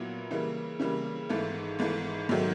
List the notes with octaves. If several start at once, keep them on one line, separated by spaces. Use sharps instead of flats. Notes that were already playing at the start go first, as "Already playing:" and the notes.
Already playing: A#2 F#3 B3 E4
C#3 E3 G3 A#3
C#3 E3 G3 A#3
G#1 G#2 E3 A3
G#1 G#2 E3 A3
G#2 D#3 F#3 A3